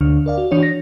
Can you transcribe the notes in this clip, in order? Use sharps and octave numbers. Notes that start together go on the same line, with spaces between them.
D2 D3 D4
A#4 D5 F5
F#4
E3 D4 F#4 C#5
A#6